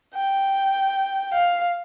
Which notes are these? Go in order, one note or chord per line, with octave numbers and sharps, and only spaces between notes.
G5
F5